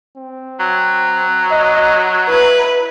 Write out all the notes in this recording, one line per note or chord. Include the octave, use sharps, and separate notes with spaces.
C4
F#3
D#5
E4 B4